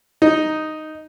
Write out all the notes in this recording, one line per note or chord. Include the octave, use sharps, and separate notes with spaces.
D#4